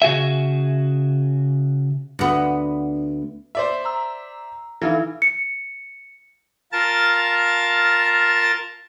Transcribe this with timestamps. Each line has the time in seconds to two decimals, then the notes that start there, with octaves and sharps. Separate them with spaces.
0.02 C#3 F#4 G#4 E5
2.19 D2 B3
3.55 C5 D5 E5
3.85 A#5 E6
4.82 E3 D#4 E4 A4
5.22 C#7
6.72 F4 A#4 A5 A6